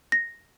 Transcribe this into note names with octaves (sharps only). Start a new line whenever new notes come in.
A#6